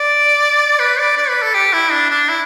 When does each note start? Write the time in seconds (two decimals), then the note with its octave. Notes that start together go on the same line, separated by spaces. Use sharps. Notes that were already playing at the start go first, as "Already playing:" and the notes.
Already playing: D5
0.79 B4
0.99 D5
1.17 D5
1.29 B4
1.42 A4
1.54 G4
1.73 E4
1.92 D4
2.11 D4
2.29 E4